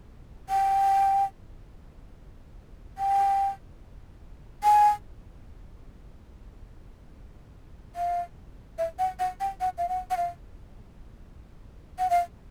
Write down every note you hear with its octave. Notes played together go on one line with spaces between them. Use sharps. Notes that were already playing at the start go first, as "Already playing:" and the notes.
G5
G5
G#5
F5
E5
F#5
F#5
G5
F#5
F5
F#5
F#5
F5
F#5
F5